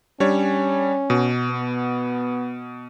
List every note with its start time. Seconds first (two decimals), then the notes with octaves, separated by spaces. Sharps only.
0.20 G3 C#4 D4 C#5
1.10 B2
1.51 B3